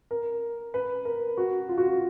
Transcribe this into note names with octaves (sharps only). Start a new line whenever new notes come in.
A#4
B4
A#4
F#4
F4
F#4
F4